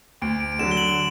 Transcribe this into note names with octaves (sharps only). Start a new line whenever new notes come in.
D2 D7
D7
D7
D3 F#3 E7
G7
F#7